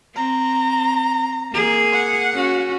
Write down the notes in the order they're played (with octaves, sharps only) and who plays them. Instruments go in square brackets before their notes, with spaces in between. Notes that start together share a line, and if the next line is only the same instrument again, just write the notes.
[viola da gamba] C4 [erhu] A#5
[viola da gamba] A#3 G#4
[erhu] F#5
[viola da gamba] C#4 F#4